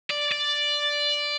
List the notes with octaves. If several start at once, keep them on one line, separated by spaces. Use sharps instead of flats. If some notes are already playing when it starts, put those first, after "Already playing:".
D5
D5